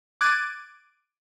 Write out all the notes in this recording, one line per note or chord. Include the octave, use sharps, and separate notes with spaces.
D6 F#6 G#6 A6 D7 D#7